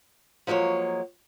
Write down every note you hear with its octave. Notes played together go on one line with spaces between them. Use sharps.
F3 F#3 G#3 A#3 C#5